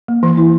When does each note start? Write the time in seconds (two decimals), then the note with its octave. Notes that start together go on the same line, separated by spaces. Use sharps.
0.08 A#3
0.23 E3
0.37 E4